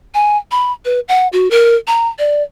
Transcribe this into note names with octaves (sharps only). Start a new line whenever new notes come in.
G#5
B5
B4
F#5
F#4
A#4
A#5
D5